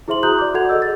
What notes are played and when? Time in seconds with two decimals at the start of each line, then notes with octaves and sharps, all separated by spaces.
0.08 E4 G#4 C5 E5 C6 F#7
0.23 F#4 A#5 D#6 F#6 G6 F#7
0.38 D5 D6
0.54 F#4 A4 F#5 G6 G#6 F7
0.69 G#4 A4 D#5 E6
0.82 A6